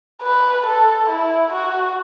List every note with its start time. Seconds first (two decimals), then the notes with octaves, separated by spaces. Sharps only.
0.22 B4
0.66 A4
1.09 E4
1.53 F#4